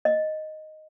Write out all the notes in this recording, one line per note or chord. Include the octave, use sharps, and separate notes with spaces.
D#5